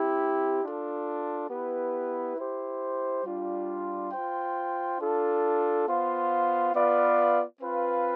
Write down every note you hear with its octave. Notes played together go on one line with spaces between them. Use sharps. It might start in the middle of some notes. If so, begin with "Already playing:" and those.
Already playing: C4 E4 G4
D4 F4 A4
B3 E4 G4 B4
E4 G4 C5
G3 D4 F4
F4 C5 G5
D4 F4 A4
B3 F4 C5 F5
B3 F4 B4 D5 F5
C4 F4 B4 F5